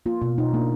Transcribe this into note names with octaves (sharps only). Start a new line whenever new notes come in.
A#3 F4
B2 F4
B2 D#4
A#3 D4